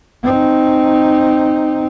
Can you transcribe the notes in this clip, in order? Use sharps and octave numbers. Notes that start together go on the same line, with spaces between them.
C4 D#4